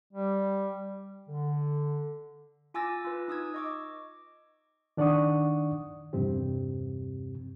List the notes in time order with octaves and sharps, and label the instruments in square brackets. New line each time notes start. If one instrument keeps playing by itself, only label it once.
[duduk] G3
[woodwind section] D3
[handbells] F4 G#5 D6 E6 A6 A#6
F4 B4
D#4 D#6 E6 G#6
D#5 C#6 D6
[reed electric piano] D#3 D4 D5 F#5 C#6 D#6
E2 G2 C3 C4 G4